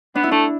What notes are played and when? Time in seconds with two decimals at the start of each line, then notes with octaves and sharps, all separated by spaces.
0.15 B3 D4
0.24 E4
0.31 A3 D4